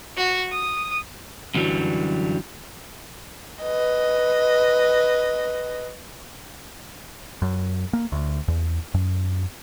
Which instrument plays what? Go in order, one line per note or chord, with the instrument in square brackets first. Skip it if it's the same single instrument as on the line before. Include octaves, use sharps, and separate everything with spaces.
[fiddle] F#4
D#6
[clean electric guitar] F#2 D3 E3 F#3 G3
[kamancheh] B4 D#5
[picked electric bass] F#2
A#3
D2
E2
F#2